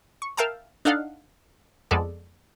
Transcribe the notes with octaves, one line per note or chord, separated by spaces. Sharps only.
C#6
A#4 E5 F5 G5 A5 A#5
D4 D#4 A4 F5 F#5
F2 G#3 B3 A4 D5